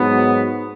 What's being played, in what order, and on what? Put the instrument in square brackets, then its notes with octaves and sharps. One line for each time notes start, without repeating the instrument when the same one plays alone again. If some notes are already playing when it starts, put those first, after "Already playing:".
Already playing: [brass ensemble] G#2 F#3 B3